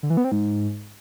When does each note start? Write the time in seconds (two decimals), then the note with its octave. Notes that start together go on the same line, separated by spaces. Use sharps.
0.03 D3
0.10 E3
0.17 B3
0.24 C4
0.32 G#2